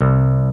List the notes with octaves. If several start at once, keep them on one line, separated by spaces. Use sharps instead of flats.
C2